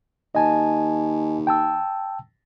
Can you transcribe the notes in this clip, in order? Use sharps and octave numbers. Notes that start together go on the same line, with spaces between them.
D#2 D#5 G#5 A5
G5 A5 E6